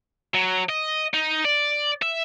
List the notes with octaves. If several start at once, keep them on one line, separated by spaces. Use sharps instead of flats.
F#3
D#5
D#4
D5
E5